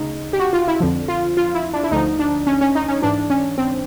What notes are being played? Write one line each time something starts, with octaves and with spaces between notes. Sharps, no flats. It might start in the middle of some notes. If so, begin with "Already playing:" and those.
Already playing: D2 C#3 D#4
G4
F#4
F4
E4
F2 D3 F3
F4
F4
E4
D4
E4
D2 D3 F3 D#4
D4
C#4
C#4
D#4
C#4
G#2 E3 D4
C#4
C4